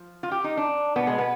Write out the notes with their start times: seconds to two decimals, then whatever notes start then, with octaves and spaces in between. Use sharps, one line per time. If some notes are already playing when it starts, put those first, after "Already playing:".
Already playing: F3
0.23 F4
0.32 G4
0.44 D#4
0.57 D4
0.96 B2 B3
1.07 G#3
1.18 B3